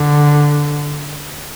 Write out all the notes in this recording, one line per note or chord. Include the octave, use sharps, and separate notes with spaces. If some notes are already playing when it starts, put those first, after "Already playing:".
Already playing: D3